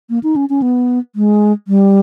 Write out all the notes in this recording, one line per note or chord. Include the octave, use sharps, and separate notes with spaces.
A#3
D#4
C#4
C#4
B3
G#3
G3